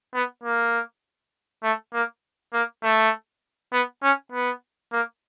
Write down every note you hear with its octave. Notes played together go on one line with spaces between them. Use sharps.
B3
A#3
A3
A#3
A#3
A3
B3
C#4
B3
A#3